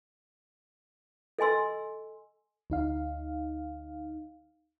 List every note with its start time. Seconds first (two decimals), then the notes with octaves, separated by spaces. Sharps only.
1.39 A4 D#5 G#5 C6 E6
2.70 D2 D#4 F5